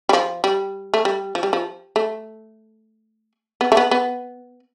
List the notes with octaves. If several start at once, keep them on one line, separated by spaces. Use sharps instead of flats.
G3
F3
G3
A3
G3
F3
G3
F3
A3
B3
A3
B3
B3